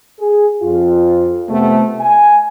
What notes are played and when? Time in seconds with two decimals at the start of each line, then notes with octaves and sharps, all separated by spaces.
0.19 G#4
0.62 F2 F4
1.49 C3 A3 B3
2.00 G#5